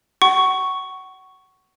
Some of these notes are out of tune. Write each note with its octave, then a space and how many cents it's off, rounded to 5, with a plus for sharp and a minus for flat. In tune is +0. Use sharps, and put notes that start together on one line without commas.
F#5 +30 C#6 +0